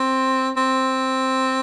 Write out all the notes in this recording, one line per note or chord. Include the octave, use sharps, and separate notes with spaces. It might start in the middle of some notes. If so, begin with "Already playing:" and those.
Already playing: C4
C4